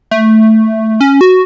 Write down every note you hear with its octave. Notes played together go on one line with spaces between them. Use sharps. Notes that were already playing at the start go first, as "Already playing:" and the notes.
A3
C#4
F#4